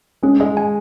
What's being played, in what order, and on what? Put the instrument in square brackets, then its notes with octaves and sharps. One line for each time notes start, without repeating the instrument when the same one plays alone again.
[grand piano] G#3 [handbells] C#4
[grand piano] G#3 [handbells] D#5
[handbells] G#5